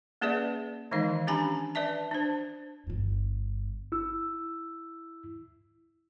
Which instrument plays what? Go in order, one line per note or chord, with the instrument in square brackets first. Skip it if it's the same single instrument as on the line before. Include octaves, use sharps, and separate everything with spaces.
[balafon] A#3 C#4 G#4 B4 D5 E5
D#3 E3 G#3 D#4 F5
C#4 D4 G4 G#5 A#5 B5
B4 D5 E5 A5
D4 C5
[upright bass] G1 G2
[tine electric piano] E4 E6